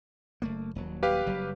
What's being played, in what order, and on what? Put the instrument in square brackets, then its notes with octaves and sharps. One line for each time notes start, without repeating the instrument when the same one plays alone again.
[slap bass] F#1 A3 A#3
D#1 F#3
[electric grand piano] G4 B4 F5
[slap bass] F#1 F#3 G3